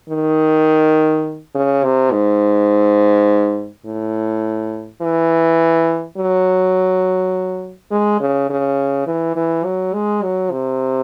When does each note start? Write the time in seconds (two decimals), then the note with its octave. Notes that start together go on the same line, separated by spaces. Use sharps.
0.09 D#3
1.55 C#3
1.84 C3
2.12 G#2
3.86 A2
5.01 E3
6.17 F#3
7.91 G#3
8.20 C#3
8.50 C#3
9.07 E3
9.36 E3
9.65 F#3
9.94 G#3
10.23 F#3
10.51 C3